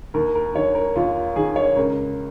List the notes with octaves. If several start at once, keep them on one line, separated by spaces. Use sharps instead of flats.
D#2 A#4
A#4
D#3 C#5
A#4
D#2 F4
D#3 G#4
C#5
C#2 A#4